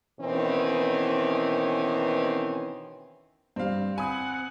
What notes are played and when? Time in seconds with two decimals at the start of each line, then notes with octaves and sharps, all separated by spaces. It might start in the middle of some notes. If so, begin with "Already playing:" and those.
0.20 B2 D#3 E3 C4 C#4
3.56 G2 G3 C4 F5
3.98 C4 F#5 G#5 B5 D#6